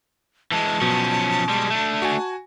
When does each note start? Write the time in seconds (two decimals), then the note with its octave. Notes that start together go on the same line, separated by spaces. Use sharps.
0.51 E3 G#3 A5
0.81 B2 F3 F#3 C#4
1.49 G3 G#3
1.70 A3 D4
2.02 F#4 G#5